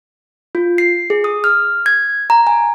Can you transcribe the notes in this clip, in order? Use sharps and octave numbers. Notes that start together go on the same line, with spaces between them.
F4
C7
G#4
D#6
F6
G#6
A#5
G#5